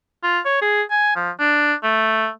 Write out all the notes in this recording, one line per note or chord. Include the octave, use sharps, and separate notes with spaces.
F4
C#5
G#4
G#5
F3
D4
A3